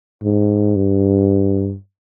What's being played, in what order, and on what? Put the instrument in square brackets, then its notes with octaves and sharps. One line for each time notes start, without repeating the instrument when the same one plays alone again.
[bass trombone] G#2
G2